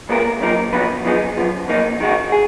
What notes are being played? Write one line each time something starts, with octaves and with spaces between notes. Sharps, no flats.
A#2 G#3 B3 F4 A#4
F#2 F3 A#3 D#4 A#4
F3 B3 D#4 F#4 B4
F#2 F3 B3 D#4 G#4
F#2 F3 B3
F2 D#3 A#3 D#4
D#3 G#3 D#4 F#4
G#4